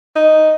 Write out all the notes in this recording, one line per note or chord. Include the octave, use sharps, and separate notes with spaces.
D#4